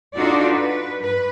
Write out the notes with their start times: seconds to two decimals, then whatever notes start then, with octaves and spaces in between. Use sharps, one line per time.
0.14 D4 D#4 F4 F#4 A4 D5
0.49 B4
0.99 G2 B4